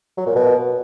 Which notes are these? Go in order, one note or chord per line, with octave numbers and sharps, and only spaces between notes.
F#3
A#2
B2